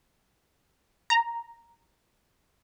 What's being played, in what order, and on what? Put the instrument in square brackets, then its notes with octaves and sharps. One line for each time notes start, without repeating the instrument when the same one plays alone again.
[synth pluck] A#5